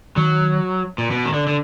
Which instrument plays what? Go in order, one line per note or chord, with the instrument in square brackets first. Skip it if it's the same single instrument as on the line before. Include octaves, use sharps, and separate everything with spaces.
[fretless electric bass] D#3 [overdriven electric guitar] F#3
[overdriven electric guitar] A#2
B2
D#3
D3
D3